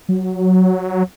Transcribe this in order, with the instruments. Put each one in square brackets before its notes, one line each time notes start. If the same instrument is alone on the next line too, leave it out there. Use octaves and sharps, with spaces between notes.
[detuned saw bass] F#3